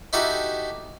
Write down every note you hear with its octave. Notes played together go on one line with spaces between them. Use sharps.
D#4 E4 F#4 G4 A4 E5